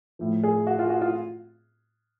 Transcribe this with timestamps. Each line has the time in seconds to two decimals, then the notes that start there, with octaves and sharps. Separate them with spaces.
0.19 A2 F3
0.43 G#4
0.67 F#4
0.79 F4
0.90 F#4
1.01 F4